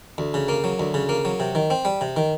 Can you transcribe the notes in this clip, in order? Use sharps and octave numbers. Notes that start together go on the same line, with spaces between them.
D2
C#3
A#3
F#3
D2
C#3
A#3
F#3
C3
D#3
C4
G3
C3
D#3